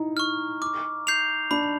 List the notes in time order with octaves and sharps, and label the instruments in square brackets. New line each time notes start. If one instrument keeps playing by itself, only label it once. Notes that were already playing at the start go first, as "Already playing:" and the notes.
Already playing: [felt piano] D#4 E4
[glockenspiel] C#6 F6
D6
G6 C7 F7
[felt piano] D4 [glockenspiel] B5